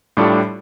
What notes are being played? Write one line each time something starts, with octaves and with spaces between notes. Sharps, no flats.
A2 G3 D4 F4 A4